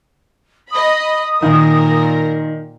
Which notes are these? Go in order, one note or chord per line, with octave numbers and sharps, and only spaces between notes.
D#5 B5 D#6
A#2 D#3 A#4